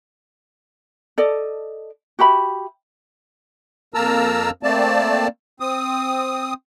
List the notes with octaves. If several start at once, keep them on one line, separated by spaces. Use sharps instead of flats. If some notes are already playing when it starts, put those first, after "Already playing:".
A4 D5 D#5
F#4 G4 E5 B5
F2 A#3 A#4 A5 A#5 E6
A3 A#3 C4 D5 A5
C4 D#6